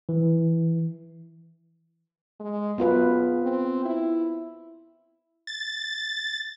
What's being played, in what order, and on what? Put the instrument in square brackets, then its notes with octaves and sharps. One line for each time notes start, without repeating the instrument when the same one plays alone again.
[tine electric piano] E3
[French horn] G#3
[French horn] F#2 [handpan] B3 F4 B4
[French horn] G#4
C4
E4
[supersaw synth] A6